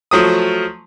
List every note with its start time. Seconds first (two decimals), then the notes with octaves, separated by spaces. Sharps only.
0.11 F3 F#3 A3 D#6